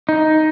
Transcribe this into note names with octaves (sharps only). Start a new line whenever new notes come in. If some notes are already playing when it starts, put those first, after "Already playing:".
D#4